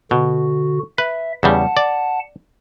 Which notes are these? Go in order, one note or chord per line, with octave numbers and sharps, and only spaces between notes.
B2 D3 F#4
B4 E5
E2 C#3 G3 F#5 A5
D5